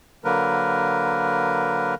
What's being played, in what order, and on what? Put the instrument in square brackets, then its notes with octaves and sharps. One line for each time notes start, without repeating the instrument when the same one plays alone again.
[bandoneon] D3 F#3 A#3 A#4 B4